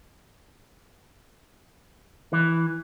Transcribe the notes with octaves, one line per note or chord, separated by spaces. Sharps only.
E3